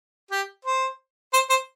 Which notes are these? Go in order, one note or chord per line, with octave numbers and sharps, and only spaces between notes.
G4
C5
C5
C5